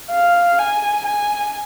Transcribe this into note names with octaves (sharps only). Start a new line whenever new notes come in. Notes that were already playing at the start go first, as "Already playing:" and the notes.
F5
G#5
G#5